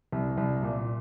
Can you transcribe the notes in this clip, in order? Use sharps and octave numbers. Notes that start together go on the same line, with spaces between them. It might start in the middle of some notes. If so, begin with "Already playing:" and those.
C2
C2
A#2